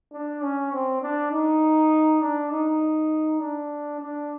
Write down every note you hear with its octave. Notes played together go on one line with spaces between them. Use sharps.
D4
C#4
C4
D4
D#4
D4
D#4
D4
D4